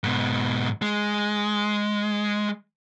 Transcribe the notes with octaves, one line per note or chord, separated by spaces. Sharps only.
G#2 B2
G#3